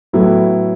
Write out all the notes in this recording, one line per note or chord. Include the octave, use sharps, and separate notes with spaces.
A2 F#3 B3 E4 A4